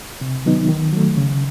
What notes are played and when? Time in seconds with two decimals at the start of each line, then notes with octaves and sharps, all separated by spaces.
0.21 C3
0.46 D#3 F#3 B3 D#4
0.69 D#3
0.93 F#3 A3
1.16 C#3